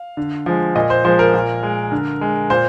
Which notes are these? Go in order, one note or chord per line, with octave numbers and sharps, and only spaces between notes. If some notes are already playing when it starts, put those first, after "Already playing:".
Already playing: F5
D3
F3 G#3
A#2 D#5
C5
F3 G#3 C5
A#4
A#2
G#3
D3
G#3
A#2 C5